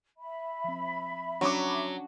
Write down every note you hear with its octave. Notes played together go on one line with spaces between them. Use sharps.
E5 B5
F3 C4
F#3 C#4 D4 C#5 D6